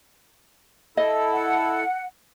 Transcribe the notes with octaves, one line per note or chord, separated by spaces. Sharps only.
E4 A4 D#5
F#5